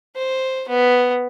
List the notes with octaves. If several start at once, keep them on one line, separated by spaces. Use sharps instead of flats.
C5
B3